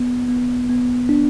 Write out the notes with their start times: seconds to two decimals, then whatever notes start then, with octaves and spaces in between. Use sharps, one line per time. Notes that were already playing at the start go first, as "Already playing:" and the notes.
Already playing: B3
0.28 B3
0.69 B3
1.09 D4